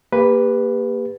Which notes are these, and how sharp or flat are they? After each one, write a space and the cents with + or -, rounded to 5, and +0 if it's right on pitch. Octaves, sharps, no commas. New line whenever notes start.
A#3 +0 G4 +35 B4 +0